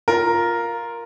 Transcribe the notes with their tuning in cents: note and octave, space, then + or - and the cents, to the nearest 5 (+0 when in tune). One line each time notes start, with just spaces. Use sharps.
F4 +0 A#4 +0